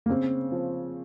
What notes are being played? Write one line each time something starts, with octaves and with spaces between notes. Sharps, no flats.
A#3
C#3 C4
F3 C4